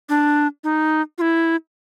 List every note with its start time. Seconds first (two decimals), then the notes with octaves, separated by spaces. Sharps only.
0.09 D4
0.64 D#4
1.18 F4
1.21 E4